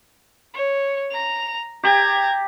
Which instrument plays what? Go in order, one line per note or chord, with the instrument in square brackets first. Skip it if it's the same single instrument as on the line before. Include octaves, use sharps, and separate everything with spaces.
[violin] C#5
A#5 F7
[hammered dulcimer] G4 [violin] A#5 G#6